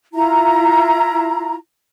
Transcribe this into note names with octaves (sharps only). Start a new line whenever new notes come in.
E4 F4 A#5